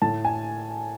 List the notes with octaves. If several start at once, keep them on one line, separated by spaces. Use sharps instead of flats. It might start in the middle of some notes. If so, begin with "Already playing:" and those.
A2 A5
G#5